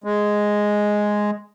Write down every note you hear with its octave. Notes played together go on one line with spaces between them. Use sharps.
G#3